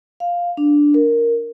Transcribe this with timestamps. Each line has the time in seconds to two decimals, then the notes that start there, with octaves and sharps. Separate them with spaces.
0.20 F5
0.57 D4
0.94 A#4